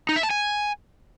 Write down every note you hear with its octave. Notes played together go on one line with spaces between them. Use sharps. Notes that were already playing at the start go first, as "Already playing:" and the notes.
D#4
E5
A5
G#5